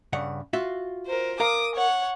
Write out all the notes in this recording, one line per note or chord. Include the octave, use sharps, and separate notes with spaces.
G2 C#3 F#5
F4 F#4 E5
A#4 C5
A#4 F5 A#5 D6 D#6
C#5 F#5